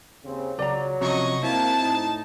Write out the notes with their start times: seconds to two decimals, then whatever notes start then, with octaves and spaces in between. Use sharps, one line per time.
0.24 D#2 C#3 C4
0.59 C#2 F#3 D5 A#5
1.01 C3 F3 C#4 F#4 D#5 C#6
1.43 A#3 C4 E4 A5
1.79 A2 D#4